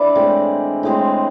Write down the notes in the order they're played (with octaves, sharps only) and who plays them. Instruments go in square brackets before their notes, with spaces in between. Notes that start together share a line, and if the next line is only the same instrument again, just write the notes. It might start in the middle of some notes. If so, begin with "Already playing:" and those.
Already playing: [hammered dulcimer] E3 D4 B4 D5 E5
A2 G#3 C4
A2 G#3 C4